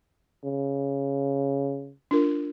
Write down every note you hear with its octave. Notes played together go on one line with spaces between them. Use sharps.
C#3
D4 F4 A#4